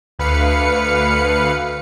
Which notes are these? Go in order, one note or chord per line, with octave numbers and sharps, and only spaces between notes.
D2 B4 F5 C#7